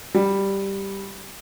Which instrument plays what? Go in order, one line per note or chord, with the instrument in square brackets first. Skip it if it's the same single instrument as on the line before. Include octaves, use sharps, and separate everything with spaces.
[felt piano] G3